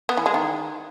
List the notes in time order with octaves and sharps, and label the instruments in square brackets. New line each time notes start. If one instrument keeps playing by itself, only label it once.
[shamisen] B3
E3
G#3
D#3